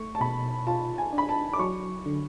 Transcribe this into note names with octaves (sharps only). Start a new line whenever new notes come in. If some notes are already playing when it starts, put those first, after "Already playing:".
Already playing: A3 C#6
A5
B2 B5
F4 A5
G#5
D4
B5
A5
D6
F#3 C#6
D3